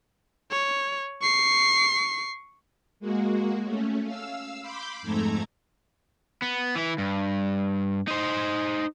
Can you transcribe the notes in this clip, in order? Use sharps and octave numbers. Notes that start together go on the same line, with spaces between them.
C#5
C#6 C7
G#3 A#3 F#4
A3 C#4
F5 E6
B5 C6 D6 G6
F2 G#2 A3 A4 A#5 G#6
B3
E3 E4
G2
D#4 C5